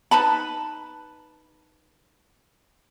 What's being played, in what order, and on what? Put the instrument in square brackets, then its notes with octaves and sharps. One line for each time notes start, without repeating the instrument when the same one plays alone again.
[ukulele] D#4 B4 A5 B5